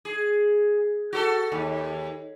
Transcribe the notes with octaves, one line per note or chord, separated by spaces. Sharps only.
G#4
F#4 A4
D#2